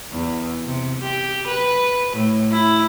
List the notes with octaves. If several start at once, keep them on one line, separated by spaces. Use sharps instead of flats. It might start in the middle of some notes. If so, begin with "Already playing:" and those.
E2
C3
G4
B4
A2
E4